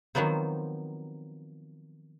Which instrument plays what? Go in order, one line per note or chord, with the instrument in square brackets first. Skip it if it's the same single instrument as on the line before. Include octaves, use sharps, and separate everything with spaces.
[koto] D#3 F3 F#3 B3 C4